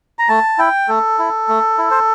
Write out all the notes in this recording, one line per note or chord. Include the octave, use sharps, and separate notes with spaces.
A#5
A3 A5
E4 G5
A3 A4
E4
A3
E4
C5